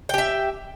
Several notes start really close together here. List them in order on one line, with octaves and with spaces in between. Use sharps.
G5 G4 E5